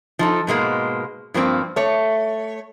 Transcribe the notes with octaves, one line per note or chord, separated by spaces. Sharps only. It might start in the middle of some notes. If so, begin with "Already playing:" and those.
F3 D#4 A4
G#2 B2 G#3 A#3
G2 F3 A#3 C4
A3 C#5